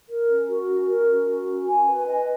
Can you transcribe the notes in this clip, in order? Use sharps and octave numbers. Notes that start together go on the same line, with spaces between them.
A#4
C#4
F#4
C#4
A#4
C#4
F#4
C#4
G#5
B4
D#5